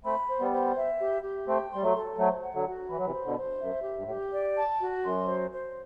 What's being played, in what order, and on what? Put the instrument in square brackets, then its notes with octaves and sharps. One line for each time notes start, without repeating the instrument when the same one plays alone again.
[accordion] A3 C4 [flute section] B5
[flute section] C5
[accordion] G3 B3
[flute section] C5
E5
G4
G4
[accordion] A3 C4 [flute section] G5
[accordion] G3 [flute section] C6
[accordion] F#3 A3
[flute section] A4
[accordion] F#3 A3 [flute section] C5
[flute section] F#5
[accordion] D3 F#3
[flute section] F#4
[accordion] E3 [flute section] B5
[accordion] F#3
C3 E3
[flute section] C5
[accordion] B2 D3
[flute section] C5
[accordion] F#2 [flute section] E5
[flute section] G4
[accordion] G2
A2
[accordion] G2 [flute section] G4
[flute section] D5
A5
F#4
[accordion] F#2 [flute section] C6
[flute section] C5
C5